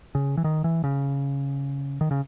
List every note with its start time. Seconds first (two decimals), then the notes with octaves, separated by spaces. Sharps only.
0.15 C#3
0.37 E3
0.44 D#3
0.64 E3
0.84 C#3
2.01 D#3
2.11 C#3